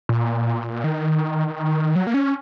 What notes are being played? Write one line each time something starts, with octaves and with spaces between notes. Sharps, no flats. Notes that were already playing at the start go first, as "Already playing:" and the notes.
A#2
D#3
F#3
A#3
C#4